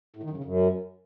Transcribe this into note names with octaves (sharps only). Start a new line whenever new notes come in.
A2
D#3
F#2
C#3
F#2